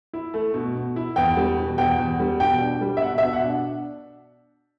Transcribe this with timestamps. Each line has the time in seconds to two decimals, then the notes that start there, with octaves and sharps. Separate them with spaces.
0.13 E4
0.34 A3
0.54 B2
0.75 B2
0.96 E4
1.16 E2 G5
1.37 G3
1.57 B2
1.78 E2 G5
1.99 E2
2.20 G3
2.40 B2 G5
2.61 D4
2.81 G3
2.97 E5
3.02 B2 F#5
3.18 E5
3.23 B2
3.33 F#5
3.43 D4